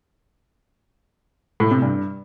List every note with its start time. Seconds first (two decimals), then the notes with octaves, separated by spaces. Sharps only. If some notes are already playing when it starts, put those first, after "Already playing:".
1.60 A2
1.71 C3
1.82 G2